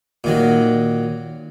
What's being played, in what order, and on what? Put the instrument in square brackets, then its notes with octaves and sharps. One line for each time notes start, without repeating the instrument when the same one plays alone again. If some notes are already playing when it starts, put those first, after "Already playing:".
[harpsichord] A#2 D#3 F#3